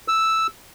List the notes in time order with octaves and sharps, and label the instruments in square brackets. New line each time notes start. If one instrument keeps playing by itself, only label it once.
[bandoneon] E6